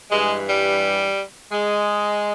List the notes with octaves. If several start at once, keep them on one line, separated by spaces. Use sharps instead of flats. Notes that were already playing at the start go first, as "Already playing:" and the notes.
G2 E3 G#3
G3
G#3